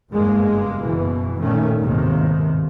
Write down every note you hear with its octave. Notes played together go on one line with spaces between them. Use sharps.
F#1 E2 G2 G#3 A#3
F#1 B2 E3
A#2 D#3 A3 C#4
G1 D#2 G#2 C3 D#3